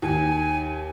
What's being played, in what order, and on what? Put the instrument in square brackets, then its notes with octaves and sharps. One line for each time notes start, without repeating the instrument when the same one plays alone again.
[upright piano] D#2 [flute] G#5